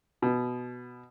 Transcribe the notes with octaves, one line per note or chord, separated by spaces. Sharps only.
B2